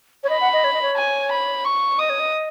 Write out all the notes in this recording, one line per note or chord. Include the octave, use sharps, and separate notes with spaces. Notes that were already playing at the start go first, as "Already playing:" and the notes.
C#5
D#5 B5
F#5
D#5
C#5
D#5
C#5
G#5
B5
C#6
D#5 D#6
C#5
D#5